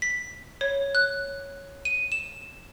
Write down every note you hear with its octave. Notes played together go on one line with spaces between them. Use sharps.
B6
C#5
F#6
D#7
E7